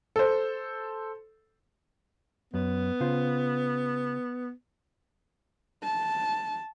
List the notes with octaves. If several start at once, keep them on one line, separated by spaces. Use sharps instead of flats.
A4 C5
F#2 B3
C#3 F4 C5
A5